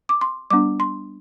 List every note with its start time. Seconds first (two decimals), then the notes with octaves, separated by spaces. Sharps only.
0.09 D6
0.21 C6
0.50 G3 B3 D4 D6
0.80 C6